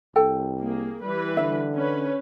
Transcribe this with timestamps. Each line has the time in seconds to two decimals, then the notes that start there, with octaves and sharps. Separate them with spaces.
0.16 C2 A4 G5
0.59 A#3 G#4
1.02 E3 G3 B4
1.37 D3 E5
1.75 C#4 B4